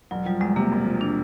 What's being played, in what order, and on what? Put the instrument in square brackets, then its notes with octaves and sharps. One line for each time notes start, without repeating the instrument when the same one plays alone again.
[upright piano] E1 [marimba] F#3
[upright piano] F3 [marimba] G3
[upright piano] E2 [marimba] G#3
[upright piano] C3 [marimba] A#3
[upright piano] E1
F3
[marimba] D4